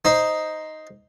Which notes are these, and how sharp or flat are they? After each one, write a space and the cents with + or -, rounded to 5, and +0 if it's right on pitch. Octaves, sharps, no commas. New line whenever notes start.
D#4 +0 C5 +0